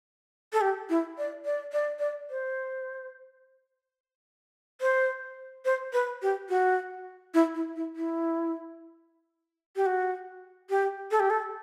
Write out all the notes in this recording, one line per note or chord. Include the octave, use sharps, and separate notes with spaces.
A4
G4
E4
D5
D5
D5
D5
C5
C5
C5
B4
G4
F#4
E4
E4
E4
E4
G4
F#4
G4
A4
G4
A4